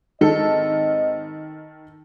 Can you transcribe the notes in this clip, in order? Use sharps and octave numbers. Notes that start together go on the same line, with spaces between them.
G#2 D#3 C4 A4 D#5